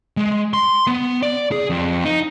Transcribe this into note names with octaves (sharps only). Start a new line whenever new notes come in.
G#3
C6
B3
D5
G#4
F2
D#4